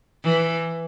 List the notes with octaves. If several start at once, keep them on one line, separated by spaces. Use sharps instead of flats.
E3